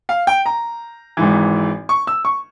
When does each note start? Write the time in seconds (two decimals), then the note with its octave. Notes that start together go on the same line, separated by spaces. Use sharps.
0.09 F5
0.27 G5
0.46 A#5
1.17 G#1 G#2 E3
1.89 C#6
2.07 E6
2.25 C#6